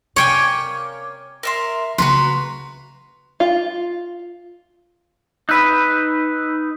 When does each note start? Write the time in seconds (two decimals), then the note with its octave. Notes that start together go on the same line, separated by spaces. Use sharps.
0.16 C3 A#3 C#4 C#5 D5 G5 G#5
1.43 A#4 E5 C6
1.98 C#3 A#3 F#4 B4 A#5 C6
3.40 F4
5.49 D#4 B4 B5 E6 F#6